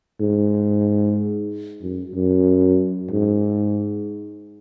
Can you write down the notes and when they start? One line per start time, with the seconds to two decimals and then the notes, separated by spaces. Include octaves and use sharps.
0.20 G#2
1.82 F#2
2.14 F#2
3.11 G#2